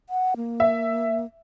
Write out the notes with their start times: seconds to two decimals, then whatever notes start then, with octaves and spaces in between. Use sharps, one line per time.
0.10 F#5
0.37 A#3
0.60 E5